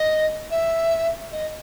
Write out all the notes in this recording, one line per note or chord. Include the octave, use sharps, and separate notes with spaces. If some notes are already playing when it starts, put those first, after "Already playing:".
Already playing: D#5
E5
D#5